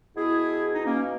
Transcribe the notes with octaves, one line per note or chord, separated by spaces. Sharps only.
B2 E4 G#4
D#4
A#3 C#4